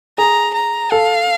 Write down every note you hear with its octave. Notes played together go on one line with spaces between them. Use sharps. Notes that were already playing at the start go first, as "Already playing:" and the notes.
G#4 A#5
A#5
A4 F5